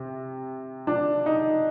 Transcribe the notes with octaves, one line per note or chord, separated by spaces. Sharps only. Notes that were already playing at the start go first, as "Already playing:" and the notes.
Already playing: C3
D4
D#4